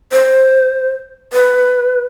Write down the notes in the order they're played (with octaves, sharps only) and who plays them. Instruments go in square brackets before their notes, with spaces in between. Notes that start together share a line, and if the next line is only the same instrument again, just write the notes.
[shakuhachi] C5
B4